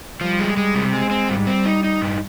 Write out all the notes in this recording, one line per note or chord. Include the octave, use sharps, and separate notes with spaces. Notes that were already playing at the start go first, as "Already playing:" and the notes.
F3 G3
G#3
G#3
C3
G#3 C4
C4
G#2 G3
C4
D#4
D#4
G2